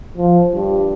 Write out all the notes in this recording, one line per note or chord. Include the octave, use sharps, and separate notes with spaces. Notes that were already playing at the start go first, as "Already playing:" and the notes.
F3
G2